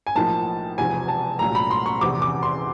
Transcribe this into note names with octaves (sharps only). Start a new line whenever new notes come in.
G#5
B1 A2 F3 A#3 A5
E1 E2 C3 F3 G#5
A5
C2 A#2 F#3 A3 A#5
B5
C6
C#6
F1 E2 C3 D6
D6
C6